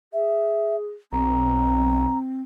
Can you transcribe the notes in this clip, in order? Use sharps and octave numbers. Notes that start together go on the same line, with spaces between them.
G#4 E5
B1 C4 A#5